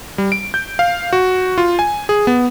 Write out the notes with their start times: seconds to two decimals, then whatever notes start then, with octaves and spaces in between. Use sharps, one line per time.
0.18 G3
0.32 D7
0.54 G6
0.79 F5
1.13 F#4
1.58 F4
1.79 G#5
2.09 G#4
2.27 B3